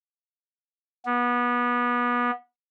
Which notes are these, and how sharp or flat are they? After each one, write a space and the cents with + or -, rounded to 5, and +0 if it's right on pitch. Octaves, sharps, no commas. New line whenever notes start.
B3 -25